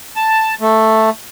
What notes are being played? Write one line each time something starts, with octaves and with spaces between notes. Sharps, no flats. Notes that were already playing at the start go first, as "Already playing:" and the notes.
A5
A3